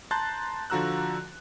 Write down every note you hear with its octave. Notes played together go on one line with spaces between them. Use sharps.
A5 A#5 C6 F#6 G6 A6
D3 F3 F#4 A#5 E6 F#6